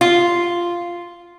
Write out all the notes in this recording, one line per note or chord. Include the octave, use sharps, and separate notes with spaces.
F4